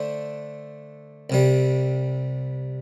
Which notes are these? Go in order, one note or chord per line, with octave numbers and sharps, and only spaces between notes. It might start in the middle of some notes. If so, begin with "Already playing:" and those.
Already playing: D3 A3 D4 A4 C5
C2 C3 G3